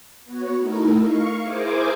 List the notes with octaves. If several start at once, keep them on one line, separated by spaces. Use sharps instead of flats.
B3 F#4 C#5
A3 D#4 E4 A#4
F5 C#6
E4 G#4 A#4 C5 G#5 D6